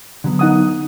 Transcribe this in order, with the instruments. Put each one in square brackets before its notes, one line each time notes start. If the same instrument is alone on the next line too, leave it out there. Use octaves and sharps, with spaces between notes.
[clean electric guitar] D3 F#3 B3
[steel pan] D#4 F#5 D#6